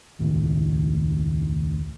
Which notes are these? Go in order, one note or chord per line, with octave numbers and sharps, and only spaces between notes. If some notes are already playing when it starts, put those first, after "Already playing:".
E1 C#2 A2 D#3